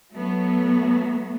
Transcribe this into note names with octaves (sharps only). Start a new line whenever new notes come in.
F#3 A3 B3